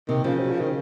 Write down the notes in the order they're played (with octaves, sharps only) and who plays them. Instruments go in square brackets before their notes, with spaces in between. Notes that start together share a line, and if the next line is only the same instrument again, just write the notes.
[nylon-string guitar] C3 [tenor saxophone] D#3
[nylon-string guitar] C#3 [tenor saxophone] F3
[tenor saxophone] F#3
F3
D#3